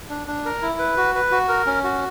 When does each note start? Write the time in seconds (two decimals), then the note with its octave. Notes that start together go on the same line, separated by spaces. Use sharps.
0.09 D4
0.27 D4
0.45 A#4
0.62 E4
0.79 B4
0.97 F#4
1.15 B4
1.31 F#4
1.48 A#4
1.66 C#4
1.84 F#4